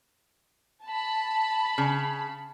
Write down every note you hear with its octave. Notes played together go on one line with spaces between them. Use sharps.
A5 B5
C#3